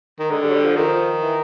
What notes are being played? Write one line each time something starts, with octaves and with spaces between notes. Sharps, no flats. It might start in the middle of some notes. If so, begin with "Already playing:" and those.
D#3
D3 G#3
G3
F#3
G3
F3
D#3 F3
E3